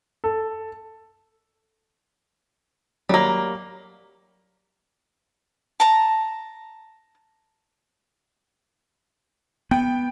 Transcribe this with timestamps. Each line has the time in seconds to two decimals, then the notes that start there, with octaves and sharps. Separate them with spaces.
0.24 A4
3.09 F#3 G3 A#3
5.80 A5 A#5
9.71 B3 G5